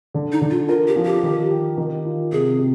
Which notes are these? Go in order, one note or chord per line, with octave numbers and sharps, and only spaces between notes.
D3
D#4
D3
F4
F4 A#4
G4
F3
G4
D#3
G4
D#3
F4
C3 G#4
C3